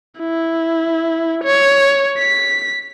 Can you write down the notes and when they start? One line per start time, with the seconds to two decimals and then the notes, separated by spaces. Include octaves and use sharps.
0.19 E4
1.44 C#5
2.18 B6